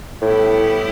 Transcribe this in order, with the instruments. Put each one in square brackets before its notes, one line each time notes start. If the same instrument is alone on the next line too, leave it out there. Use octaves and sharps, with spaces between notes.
[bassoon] A2 [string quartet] G3 B3 E4 G4